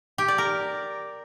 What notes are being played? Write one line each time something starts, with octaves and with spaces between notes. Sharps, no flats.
G4
D5
A#4